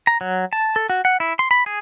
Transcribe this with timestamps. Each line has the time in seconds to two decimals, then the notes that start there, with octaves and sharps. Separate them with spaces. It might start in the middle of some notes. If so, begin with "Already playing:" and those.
0.07 A#5
0.21 F#3
0.53 A5
0.76 A4
0.90 F#4
1.05 F#5
1.20 E4
1.39 C6
1.51 B5
1.66 G#4